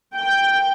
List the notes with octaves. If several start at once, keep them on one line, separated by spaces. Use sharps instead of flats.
G5